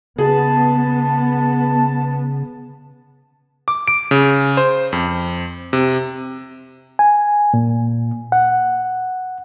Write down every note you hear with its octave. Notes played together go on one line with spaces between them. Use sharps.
C#3 B3 G#4 A5
D6
D7
C#3
C5
F2
C3
G#5
A#2
F#5